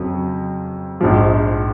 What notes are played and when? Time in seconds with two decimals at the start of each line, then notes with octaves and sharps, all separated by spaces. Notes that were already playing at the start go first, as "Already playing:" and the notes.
Already playing: F2 C#3 F#3 C4
1.01 A#1 G#2 F3